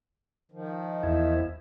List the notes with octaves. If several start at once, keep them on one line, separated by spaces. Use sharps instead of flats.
D#3 F3
E2 E4